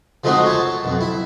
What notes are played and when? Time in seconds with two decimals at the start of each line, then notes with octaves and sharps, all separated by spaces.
0.24 F3 G#3 A3 C4 D#4 F#4
0.46 C#5 A5
0.84 B1 F2
1.01 E4